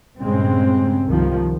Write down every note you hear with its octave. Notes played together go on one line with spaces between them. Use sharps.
G2 A#2 C#3 G#3 C4
C2 D#3 F3